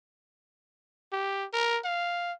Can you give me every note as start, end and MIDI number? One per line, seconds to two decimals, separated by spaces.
1.12 1.45 67
1.53 1.79 70
1.84 2.32 77